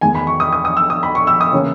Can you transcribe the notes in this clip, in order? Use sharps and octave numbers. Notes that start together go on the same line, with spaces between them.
E2 D#3 G#3 G#5
B5
C#6
D#6
D#6
D#6
E6
D#6
B5
C#6
E6
D#6
C#3 E3 A#3 C#4